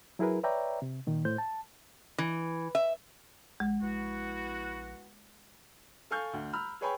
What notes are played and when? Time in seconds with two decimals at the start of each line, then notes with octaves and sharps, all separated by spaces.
0.19 F#3 E4 G#4 A#4 B4
0.44 B4 C#5 D5 E5 G5 A#5
0.82 C3
1.07 A#2 D#3
1.25 A2 C5 G6
1.38 A5
2.18 E3
2.75 E5
3.60 A#1 G#3
3.82 A#1 B3 E4 F#4
6.11 A4 F5 G#5 C#6 F6 G6
6.33 D2
6.53 A#5 B5 E6 F6
6.81 G#4 B4 C#5 G5 G#5 B5